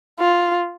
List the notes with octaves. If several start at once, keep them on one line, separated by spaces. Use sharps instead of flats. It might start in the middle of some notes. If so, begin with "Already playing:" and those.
F4